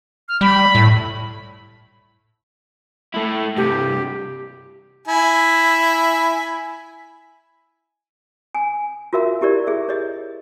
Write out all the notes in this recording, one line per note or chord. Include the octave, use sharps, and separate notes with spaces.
F6
G3 B5
A2
A3 E4
G2 C3 G4
E4 G#5
G#5
F4 F#4 A#4 E5 F5
E4 G4 A#4 D5
G#4 E5
C#5 D#5